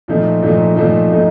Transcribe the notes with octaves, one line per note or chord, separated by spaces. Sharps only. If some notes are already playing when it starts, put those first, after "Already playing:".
A#2 F3 A3 D#4
A#2 F3 A3 D#4
A#2 F3 A3 D#4
A#2 F3 A3 D#4